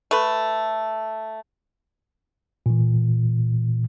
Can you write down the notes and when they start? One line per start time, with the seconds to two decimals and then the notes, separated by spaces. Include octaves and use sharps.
0.11 A3 B4
2.66 A#2 E3